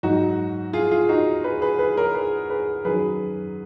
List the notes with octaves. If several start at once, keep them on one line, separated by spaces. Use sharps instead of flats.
G#2 F#3 D#4 F#4
F4 G#4
F4 G#4
D#4 F#4
G#4 B4
G#4 B4
G#4 B4
A#4 C#5
G#4 B4
G#4 B4
F#2 D#3 F#3 G#4 B4